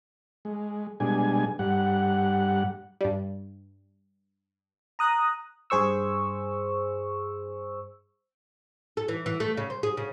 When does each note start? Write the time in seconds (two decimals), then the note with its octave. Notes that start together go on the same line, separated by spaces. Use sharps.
0.45 G#3
1.00 B2 G3 G#3 D4 G#5
1.59 G2 G3 F#5
3.01 G2 G3
4.99 A#5 D#6 F#6
5.70 G2 G#4 C5 C#6 E6
8.97 A4
9.08 E3
9.26 E3
9.40 A3
9.57 C#3
9.70 C5
9.83 G#4
9.97 C#3